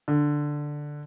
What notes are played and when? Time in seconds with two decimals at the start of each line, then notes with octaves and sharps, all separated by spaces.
0.08 D3